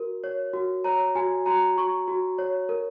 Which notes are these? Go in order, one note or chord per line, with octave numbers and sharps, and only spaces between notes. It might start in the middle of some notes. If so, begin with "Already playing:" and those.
Already playing: F#4 A#4
C#5
F#4
C#5 A#5
F#4 G#5
F#4 A#5
F#4 C#6
F#4
C#5
A#4